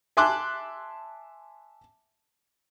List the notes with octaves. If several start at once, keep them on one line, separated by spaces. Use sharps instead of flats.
E5 G#5 A5 C6 D6 F#6